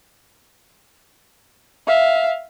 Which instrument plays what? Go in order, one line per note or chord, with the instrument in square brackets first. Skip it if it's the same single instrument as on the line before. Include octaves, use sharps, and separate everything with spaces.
[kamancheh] E5 F5